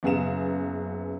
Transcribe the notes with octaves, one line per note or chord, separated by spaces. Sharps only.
F#1 F#2 B3 G#4 F5 E7